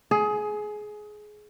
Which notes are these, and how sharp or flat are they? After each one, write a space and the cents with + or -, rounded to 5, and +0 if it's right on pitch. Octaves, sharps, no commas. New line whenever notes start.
G#4 +20